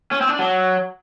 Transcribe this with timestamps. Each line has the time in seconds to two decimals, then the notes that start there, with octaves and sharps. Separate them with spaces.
0.11 C#4
0.21 C4
0.30 D4
0.39 F#3